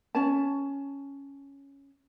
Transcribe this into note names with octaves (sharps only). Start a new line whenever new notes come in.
C#4 C#5 G#5 A5